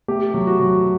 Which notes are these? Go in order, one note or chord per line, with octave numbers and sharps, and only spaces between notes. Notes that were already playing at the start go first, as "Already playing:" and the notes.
A3 G4
F#3
F#4
F#3